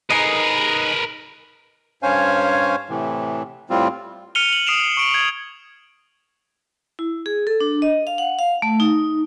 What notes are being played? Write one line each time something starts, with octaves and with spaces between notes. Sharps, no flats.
D#4 G#4 A#4 B4 D#5
G2 C#4 C5 C#5 F5 G#5
A2 C3 E3
A2 G3 C4 F4
F6 C#7 D#7 F7 G7
F#7
D#6 C7 D7 E7 F7
C#6 D7
G#6
E4
G#4
A4
D4
D#5
F5
F#5
F5
A3
D#4